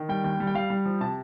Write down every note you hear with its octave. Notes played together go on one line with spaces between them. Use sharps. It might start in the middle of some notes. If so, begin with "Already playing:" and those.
Already playing: D#3
G3 G5
D#2 G5
G3
G5
G3 F5
G3
F3
C3 A5